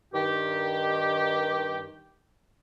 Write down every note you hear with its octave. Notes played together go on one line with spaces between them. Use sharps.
G2 D#3 G4